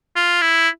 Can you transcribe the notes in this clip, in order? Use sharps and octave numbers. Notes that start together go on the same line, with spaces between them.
F4
E4